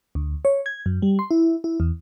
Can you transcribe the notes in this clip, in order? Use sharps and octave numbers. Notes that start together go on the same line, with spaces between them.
D2
C#5
G#6
F#2
G3
C6
E4
E4
E2